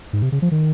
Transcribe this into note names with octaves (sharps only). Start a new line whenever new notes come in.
G#2
C3
C#3
F3
D#3